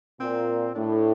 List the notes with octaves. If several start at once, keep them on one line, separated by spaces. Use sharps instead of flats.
A#2 C4
A2 D4